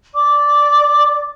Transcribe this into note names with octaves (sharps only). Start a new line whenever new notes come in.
D5 D6